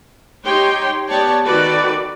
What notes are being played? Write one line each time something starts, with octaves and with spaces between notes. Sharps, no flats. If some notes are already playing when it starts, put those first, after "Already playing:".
D#4 G4 C#5 G5 C6
B3 G4 C#5 D5 A5
D#3 F#4 A4 B4 D5